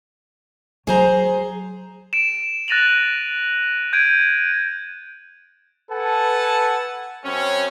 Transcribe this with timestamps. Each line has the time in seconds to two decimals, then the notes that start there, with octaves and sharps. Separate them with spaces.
0.87 F#3 G#4 C5 A#5
2.13 D7 E7
2.68 F#6 A6 A#6 D#7 F7 F#7
3.93 G6 G#6 D7 D#7
5.91 A4 B4 F#5 G#5 A5
7.24 F#2 C4 C#4